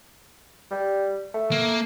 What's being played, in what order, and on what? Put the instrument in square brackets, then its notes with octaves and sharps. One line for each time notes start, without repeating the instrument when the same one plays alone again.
[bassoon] G3
A3
[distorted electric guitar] A#3